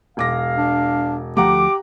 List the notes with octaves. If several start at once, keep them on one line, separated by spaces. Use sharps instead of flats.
E1 F5 D6 A#6
D4
D2 F3 A3 G4 F#5 A#5 D6